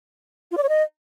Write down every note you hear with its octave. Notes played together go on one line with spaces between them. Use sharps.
F4
D5
C#5
D#5